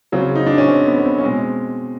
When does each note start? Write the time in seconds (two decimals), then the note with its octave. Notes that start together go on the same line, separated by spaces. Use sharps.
0.12 C#3 F#3 C4
0.35 D#4
0.46 D4
0.58 C#4
0.68 C4
0.86 B3
0.98 B3
1.05 C4
1.18 C#4
1.24 B2 G#3 C4